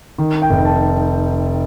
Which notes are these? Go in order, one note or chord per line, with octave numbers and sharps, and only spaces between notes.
D#3
G5
F1
A5